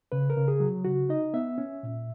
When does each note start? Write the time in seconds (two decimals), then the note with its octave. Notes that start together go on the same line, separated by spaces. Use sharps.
0.12 C#3 B4
0.30 A#4
0.37 C#3
0.48 G#4
0.60 F#3
0.85 C#3 F#4
1.09 D#4 D#5
1.34 B3 E5
1.58 C#4
1.83 A#2